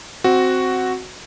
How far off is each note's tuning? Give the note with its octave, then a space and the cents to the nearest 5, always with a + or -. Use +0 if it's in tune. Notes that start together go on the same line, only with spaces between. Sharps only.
C4 +0 F#4 +0